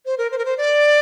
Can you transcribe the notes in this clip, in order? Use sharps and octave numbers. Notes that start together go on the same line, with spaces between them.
C5
A#4
C5
A#4
C5
D5